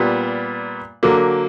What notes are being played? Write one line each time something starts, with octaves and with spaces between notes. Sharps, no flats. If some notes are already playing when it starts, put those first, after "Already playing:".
Already playing: A#2 G3 B3
D3 F#3 A#3